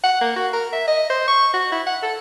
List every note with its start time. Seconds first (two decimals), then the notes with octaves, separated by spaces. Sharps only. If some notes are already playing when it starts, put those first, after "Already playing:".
0.03 F#5
0.21 A#3
0.36 F#4
0.53 A#4
0.73 E5
0.88 D#5
1.10 C5
1.28 C#6
1.53 F#4
1.72 E4
1.87 F#5
2.03 A4